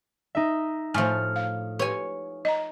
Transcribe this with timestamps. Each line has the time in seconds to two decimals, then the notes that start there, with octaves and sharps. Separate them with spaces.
0.35 D#4 E5
0.94 A2 F3 E5 G#5 F6 C#7
1.36 F5
1.79 G4 B4 C#5 G#5
2.45 D#5 A#5